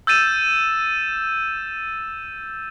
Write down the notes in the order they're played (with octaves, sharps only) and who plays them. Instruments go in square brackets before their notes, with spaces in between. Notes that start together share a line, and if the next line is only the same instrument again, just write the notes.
[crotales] E6 G6 A6 D#7 E7